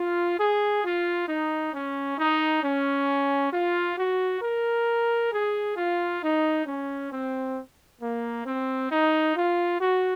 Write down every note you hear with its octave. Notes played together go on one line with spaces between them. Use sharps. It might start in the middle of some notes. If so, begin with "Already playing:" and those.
Already playing: F4
G#4
F4
D#4
C#4
D#4
C#4
F4
F#4
A#4
G#4
F4
D#4
C#4
C4
A#3
C4
D#4
F4
F#4